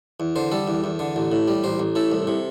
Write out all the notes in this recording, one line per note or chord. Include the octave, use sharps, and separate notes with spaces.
E2
D3 C5
G3 A4
E2
E2
D3
A1
A2
G3
A1 C5
A1
A2 A4
C2
C3